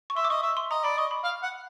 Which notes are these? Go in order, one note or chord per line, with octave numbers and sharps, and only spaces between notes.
C#6
E5 C6
D6
D#5 C#6
E5 C#6
C6
D#5 A#5
D5 B5
D#5 C#6
B5
F5
F#5